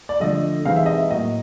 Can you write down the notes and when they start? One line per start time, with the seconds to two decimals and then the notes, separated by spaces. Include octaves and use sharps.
0.09 D5
0.20 D3 F3 A3 D4 D#5
0.65 C3 E3 G#3 C4 D#4 F5
0.76 E5
0.86 D#5
0.96 E5
1.10 A2 F#3 A#3 D#5